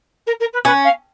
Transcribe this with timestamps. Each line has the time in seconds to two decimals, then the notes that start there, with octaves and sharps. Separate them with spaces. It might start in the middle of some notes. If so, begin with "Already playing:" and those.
0.26 A#4
0.40 A#4
0.53 B4
0.65 C#4 B4
0.84 F5